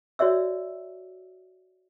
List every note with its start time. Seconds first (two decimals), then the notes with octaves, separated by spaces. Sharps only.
0.19 F#4 C#5 D5 E5 E6